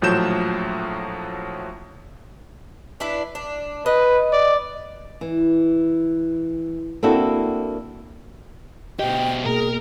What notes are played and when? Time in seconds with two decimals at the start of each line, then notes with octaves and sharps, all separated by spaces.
0.02 A#1 A2 F3 F#3 G6 E7
3.00 D4 E4 B4
3.35 D4
3.86 B4 D#5
4.33 D5
5.21 E3
7.03 A#3 C4 D4 E4 F#4 A4
8.99 B2 G4 D#5 G5
9.45 B2 A#3 G#4 A#4 A#5